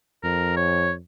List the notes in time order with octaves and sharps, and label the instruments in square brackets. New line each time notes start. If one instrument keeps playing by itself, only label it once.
[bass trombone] F2 [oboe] A#4
[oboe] C#5